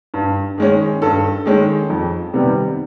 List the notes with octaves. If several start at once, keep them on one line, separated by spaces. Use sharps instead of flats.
G2
D#3 G#3 C#4
G2 A4
D#3 G#3 C#4
F2
C3 D#3 G3 B3